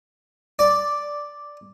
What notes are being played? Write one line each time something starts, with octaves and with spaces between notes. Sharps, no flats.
D5